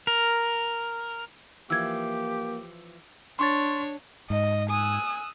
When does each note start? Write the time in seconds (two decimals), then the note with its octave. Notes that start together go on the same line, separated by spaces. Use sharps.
0.07 A#4
1.70 E3 F3 A#3 G4 E6 G#6
3.39 D4 C#5 C6 C#6 A6
4.30 G#2 D#5
4.70 G#5 D#6 E6 F#6